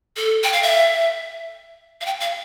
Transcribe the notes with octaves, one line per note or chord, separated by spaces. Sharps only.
A4
G5
F5
E5
F5
G5
F5